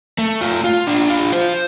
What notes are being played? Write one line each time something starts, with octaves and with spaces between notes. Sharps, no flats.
A3
F4
F4
D4
F4
C5